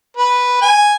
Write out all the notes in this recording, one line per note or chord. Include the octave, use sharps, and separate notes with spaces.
B4
G#5